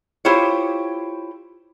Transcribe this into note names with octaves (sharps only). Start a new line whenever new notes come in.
E4 F4 G4 C5 C#5